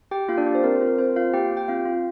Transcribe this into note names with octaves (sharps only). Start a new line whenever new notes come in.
G4 G5
A#3 F4 F5
D4 D5
G4
C5
C4 A#4
C5
F4
A#4
C4 C5
F4 F5
A#3 G4 G5
G4
G5
C4 F4 F5
F4